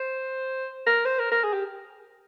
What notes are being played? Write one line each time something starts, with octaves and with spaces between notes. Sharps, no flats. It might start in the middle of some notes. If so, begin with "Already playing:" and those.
Already playing: C5
A#4
C5
A#4
A#4
G#4
G4